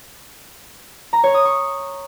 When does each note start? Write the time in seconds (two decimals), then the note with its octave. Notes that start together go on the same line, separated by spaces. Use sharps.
1.13 A#5
1.24 C#5
1.34 D#6
1.45 C#6